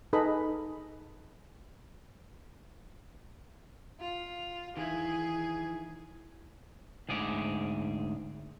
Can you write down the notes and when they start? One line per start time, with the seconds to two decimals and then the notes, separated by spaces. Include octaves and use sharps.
0.13 D#4 G#4 A4 B4 D#5 B5
4.01 F4
4.77 D#3 E3 E4 G#4
7.09 D2 G#2 G#4 D5